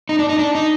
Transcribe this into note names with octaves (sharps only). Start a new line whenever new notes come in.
D#4
D4
D#4
D4
D#4